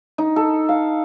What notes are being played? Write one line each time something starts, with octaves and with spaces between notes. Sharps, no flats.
D#4
A4
F5